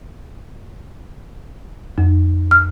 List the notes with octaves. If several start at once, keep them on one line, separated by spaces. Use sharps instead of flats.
F2
F6